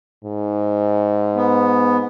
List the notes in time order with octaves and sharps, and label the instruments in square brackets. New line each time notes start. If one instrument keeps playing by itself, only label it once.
[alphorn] G#2
[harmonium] B3